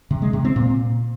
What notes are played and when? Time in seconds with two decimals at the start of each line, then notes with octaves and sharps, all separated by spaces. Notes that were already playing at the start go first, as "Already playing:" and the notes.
0.11 C3
0.22 G#3
0.33 C3
0.45 C4
0.56 A#2